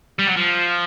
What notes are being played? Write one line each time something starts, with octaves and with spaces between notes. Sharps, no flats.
G3
F#3
F3